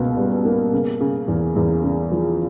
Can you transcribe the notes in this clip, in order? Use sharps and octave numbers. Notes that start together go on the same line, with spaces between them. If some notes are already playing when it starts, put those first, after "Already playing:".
Already playing: C#2 B2 A#3
G3
A#3
C#3
C#3
E2
E2
C#3
F3